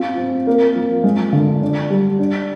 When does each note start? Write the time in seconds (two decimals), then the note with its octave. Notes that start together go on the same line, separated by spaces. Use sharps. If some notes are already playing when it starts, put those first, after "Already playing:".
Already playing: C4 F4
0.18 C4
0.47 A#3
0.76 F3
1.04 G#3
1.32 D3
1.62 D4
1.90 G3
2.19 D4